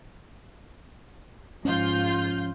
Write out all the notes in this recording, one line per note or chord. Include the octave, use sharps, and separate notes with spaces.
G#2 F3 C#4 F4 G6